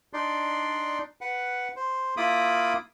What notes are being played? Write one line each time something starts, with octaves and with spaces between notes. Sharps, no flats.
D4 D#4 D5 C6
B4 F#5
C5
A#3 E4 F4 B5 D6 D#6